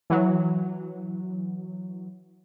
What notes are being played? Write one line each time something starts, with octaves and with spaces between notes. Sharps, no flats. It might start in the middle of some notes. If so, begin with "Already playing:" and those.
E3 F#3